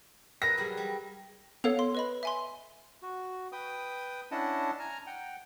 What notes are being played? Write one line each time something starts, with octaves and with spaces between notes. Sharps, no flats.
A#4 B4 A#6
F#3 G3 G#4
G3
B3 A4 C#5 F5 F7
C6
B4 D#5 B5
E5 G#5 C6
F#4
B4 G5 D#6
C#4 D4 E4 D#5 F#5 A5
G#5 A#5 F6
F#5 G5